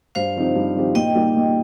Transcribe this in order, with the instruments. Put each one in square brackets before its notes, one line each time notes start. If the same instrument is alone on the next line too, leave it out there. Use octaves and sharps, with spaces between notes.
[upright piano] G2 [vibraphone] C5 F5
[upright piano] F3 C4 D#4 G4
G2
F3 C4 D#4 G4
[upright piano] A#2 [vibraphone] D#5 G5
[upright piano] G3 A#3 D#4 G4
A#2